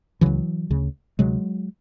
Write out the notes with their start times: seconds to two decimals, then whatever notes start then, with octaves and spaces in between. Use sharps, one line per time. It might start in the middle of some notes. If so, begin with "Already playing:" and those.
0.21 C#2 C#3 E3 F#3
0.71 D2 C#3
1.19 D2 C3 F#3 G#3